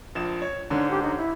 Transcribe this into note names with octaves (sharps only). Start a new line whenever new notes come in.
A#1 F3 E7
C#5
G#2 D3 C#4 D4
G4
D#4
E4